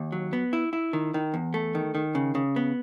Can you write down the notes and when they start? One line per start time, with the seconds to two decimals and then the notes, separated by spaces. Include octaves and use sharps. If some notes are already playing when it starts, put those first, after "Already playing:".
Already playing: D#2
0.12 F#3
0.33 B3
0.53 E4
0.73 E4
0.93 D#3
1.14 D#3
1.34 E2
1.54 A3
1.75 D#3
1.95 D#3
2.15 C#3
2.35 C#3
2.56 B3